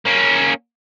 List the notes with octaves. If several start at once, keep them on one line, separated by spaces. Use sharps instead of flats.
A#3 C#4